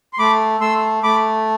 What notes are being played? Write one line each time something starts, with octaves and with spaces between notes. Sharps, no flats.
C6
A3 B5 D6
A3 C6 E6
A3 B5 D6